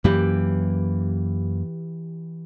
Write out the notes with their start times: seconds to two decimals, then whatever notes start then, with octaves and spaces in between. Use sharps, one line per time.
0.04 F#2 E3 A#3 G4 B4